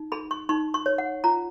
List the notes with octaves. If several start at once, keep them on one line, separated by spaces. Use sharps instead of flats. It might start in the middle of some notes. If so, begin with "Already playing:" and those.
Already playing: D#4
G#4 B5
C#6
D#4 C#6
C#6
C#5
F#5
F4 A#5